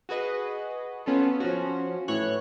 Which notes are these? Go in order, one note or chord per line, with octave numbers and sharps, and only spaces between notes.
F#4 G#4 B4 D#5
B3 C#4 F4 A4
F3 C#4 F#4
A2 E3 C#5 F#6